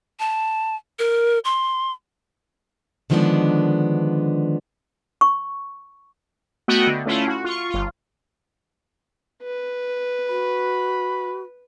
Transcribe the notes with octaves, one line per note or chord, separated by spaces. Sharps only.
A5
A#4
C6
D3 D#3 F3 G#3 B3 D4
C#6
A3 B3 F#4 D#5 F#5 G5
D3
A3 C#4 E4 F4
F#4
F4 C#6
G1 F4
B4
F#4 B5